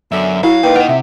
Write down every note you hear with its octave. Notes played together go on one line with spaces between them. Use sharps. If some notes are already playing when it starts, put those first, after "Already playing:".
F#2 B2 D3 E5
F#3 E4 F5
A#2 D#4 B4 G5
A#4 D#5 F#5
C3 E5